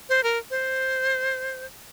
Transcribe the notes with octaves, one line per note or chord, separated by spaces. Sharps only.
C5
A#4
C5